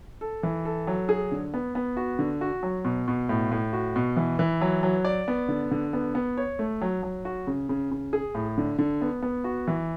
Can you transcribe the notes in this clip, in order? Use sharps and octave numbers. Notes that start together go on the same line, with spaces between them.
A4
E3
A4
F#3
G#4
D3
B3
B3
F#4
D3
F#4
F#3
B2
B2
A2
A2
F#4
B2
E3
E3
F#3
F#3
D5
B3
D3
D3
B3
B3
C#5
A3
F#3
F#3
F#4
C#3
C#3
C#3
G#4
A2
D3
D3
B3
B3
F#4
E3